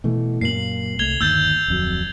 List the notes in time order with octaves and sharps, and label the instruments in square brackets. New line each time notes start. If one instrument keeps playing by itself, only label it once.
[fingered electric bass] B2 E3 A3
[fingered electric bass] F#2 A#2 A#3 [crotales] C7 F#7
[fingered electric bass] C2 A3 [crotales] G#6 F7 G7
[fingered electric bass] G1 D#2 [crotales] E6 G6 A6
[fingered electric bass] D1 F2 F#3